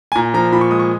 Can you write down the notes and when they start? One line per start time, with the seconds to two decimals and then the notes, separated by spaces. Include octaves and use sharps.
0.12 G#5
0.15 A#2 A#5
0.34 F3 A#5
0.52 A#2 B5
0.61 C#6
0.70 G#3 D#6
0.79 C#6